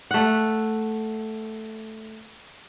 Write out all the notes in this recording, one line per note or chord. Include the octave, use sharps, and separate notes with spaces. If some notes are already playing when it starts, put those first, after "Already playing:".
A3 F#5